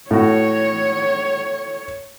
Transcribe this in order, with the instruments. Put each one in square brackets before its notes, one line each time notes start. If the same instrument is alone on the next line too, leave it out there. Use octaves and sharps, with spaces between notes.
[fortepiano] A2 F#4 [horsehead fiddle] C#5